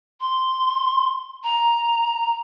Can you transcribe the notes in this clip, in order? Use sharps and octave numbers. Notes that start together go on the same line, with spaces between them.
C6
A#5